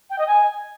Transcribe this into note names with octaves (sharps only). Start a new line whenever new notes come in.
G5
D#5
G#5